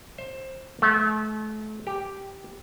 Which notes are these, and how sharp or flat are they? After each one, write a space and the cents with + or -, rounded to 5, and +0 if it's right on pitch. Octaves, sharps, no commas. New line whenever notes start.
C5 +20
A3 -35
G4 +0